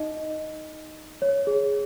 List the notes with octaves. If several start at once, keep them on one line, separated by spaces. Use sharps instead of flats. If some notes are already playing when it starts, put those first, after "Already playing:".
Already playing: D#4 D#5
C#5
G#4